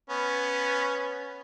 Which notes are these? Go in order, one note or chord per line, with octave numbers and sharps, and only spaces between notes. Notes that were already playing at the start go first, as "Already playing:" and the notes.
B3 C#4